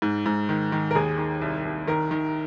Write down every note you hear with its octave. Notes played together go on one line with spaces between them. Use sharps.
G#2
G#2
D#3
D#3
A#4
D#2 G#4
D#3
C2
C2
D#3 A#4
D#3